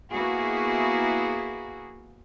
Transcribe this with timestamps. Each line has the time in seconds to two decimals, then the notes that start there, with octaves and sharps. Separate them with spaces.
0.12 A#3 B3 E4 F#4 G#4